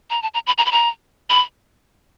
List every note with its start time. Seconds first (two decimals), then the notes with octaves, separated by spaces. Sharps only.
0.10 A#5
0.22 A5
0.34 A#5
0.47 B5
0.58 A#5
0.66 B5
0.72 A#5
1.30 B5